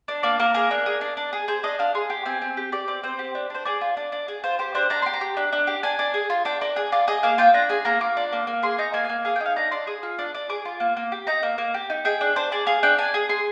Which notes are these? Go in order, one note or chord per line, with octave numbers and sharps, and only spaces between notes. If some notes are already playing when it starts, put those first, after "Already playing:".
D4
A#3 D5
A#3 A#4
G#4 A#4
D4
G#4
D4
D4
G#4
G#4 C5
D4 D#5
D4 F5
G#4 C6
G4
C4 G#5
C4
G4
G4 D5
C4 D5
C4 C5
G4
D4
D4 C5
G#4 D5
F4
D4
D4
G#4
F4 C5
G4 C5
D4 C5
D4 A#5
G4 C6
A#5
G4
D4
D4
G4
D4 G#5
D4
G#4
F4
D4 G5
D4 A#4
G#4
F4 D5
G#4 D#5
A#3 F5
F4 G5
D4 A#5
G#4 G#5
A#3 A#5
F4 D6
D4
A#3
A#3
G#4 C6
D#4 A#5
A#3 G#5
G#5
A#3
G#4 F5
G5
D#4
F5
D4 A#5
D4 C6
G#4 D#6
F4
D4
D4
G#4 D6
F4
A#3
A#3
G4
D#4 A#5
A#3
A#3
G4
D#4
G#4 G5
D4
D4 C5
G#4 D5
G#4 F5
D4 G5
D4 G#5
G#4
G#4 C6